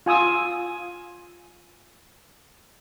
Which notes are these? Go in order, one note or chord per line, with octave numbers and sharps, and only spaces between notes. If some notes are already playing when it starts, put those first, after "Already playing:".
F4 G#5 D#6 E6